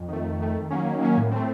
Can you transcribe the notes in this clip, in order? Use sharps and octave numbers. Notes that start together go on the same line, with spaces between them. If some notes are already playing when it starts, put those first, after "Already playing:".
Already playing: F2
D#3 A3
F2
D#3 A3
D#3
F#3 A#3 C#4
D#3
F#3 A#3 C#4
A2
A3 C4